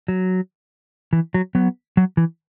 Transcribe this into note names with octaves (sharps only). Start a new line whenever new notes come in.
F#3
E3
F#3
F#3 B3
F#3
E3